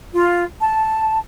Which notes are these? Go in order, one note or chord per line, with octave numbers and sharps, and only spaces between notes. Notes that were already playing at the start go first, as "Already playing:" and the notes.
F4
A5